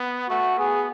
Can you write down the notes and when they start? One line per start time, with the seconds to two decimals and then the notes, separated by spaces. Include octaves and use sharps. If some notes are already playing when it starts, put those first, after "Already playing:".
Already playing: B3
0.29 A3 F#4
0.58 B3 G#4